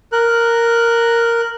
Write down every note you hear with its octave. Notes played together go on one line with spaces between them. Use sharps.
A#4 F#6